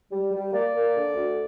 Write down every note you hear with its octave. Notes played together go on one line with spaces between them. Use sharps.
G3
G3
A#3 D5
A#3
D3
D2